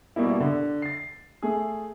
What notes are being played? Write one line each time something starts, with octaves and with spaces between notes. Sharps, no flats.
B2 G3 A#3 E4
D3
A6 C7
A3 G#4